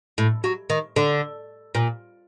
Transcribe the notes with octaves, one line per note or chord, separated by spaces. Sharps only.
A2
F#3
D#3
D3
A#2